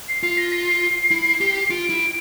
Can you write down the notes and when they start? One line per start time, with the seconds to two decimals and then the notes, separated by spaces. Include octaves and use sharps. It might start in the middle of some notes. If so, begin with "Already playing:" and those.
0.09 C7
0.22 F4 C7
0.37 A#6
0.52 C7
1.11 E4
1.41 G4
1.65 C7
1.70 F4 D7
1.90 E4